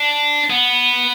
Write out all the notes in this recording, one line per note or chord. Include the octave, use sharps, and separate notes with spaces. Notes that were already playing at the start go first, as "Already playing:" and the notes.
Already playing: D4
B3